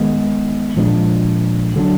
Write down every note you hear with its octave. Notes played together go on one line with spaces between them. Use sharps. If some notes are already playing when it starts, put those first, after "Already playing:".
Already playing: D#3 G#3 B3
A#2 F3 G#3 D4
D3 F#3 B3 D4